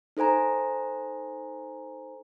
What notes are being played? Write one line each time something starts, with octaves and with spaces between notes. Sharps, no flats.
D#4 A4 C5 G#5 A#5